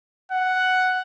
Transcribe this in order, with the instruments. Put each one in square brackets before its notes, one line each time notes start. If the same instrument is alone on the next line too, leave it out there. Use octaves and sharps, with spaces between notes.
[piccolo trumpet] F#5